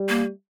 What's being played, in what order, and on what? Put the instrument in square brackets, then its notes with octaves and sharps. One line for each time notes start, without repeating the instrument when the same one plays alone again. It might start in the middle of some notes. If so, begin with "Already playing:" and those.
Already playing: [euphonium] G3
[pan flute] A#3